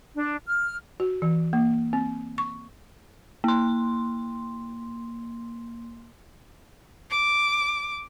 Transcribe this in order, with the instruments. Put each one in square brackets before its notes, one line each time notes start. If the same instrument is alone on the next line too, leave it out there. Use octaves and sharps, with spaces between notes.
[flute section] D4
F6
[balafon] F#4
E3
A#3
C4
C#6
[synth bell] A#3 C6
[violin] D6